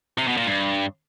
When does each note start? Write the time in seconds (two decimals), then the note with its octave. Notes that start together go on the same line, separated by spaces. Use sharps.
0.18 C3
0.28 B2
0.37 A#2
0.47 G2